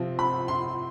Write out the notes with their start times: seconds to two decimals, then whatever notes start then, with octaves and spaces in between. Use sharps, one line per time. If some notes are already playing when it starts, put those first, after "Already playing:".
Already playing: C3 F3 C4
0.19 B5
0.48 C6